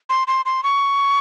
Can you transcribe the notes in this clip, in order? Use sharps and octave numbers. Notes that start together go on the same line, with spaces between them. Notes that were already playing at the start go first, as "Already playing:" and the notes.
C6
C6
C6
C#6